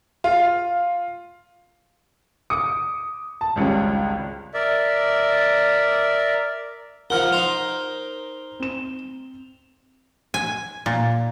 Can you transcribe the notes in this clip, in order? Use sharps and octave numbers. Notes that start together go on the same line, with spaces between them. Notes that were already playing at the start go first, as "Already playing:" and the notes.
F4
D6 D#6 C#7
A5
G#1 C#2 G3 C#4
A#4 D5 E5
F3 A#4 F#5 F6 G7
D#4 C5 F7
C4 E7
G#5
A#2